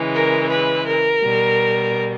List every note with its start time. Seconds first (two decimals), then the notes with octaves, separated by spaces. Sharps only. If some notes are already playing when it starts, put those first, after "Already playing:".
Already playing: C#3 E3 G#3
0.14 A#4
0.50 B4
0.86 A#4
1.23 B2 G3